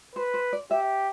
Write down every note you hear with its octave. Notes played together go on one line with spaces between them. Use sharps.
B4 C5
C5
D5
G4 E5